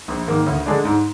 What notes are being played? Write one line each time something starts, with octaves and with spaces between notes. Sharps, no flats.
A#1
G#2 D#3 A#3
D2
D3 G#3 D4
G#2